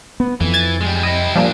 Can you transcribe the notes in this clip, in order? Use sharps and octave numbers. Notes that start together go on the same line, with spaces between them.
B3
F2 E3
G#6 A6
G3 G#3
G3 E4 D#5
A#2 F3 G3 A#3 D4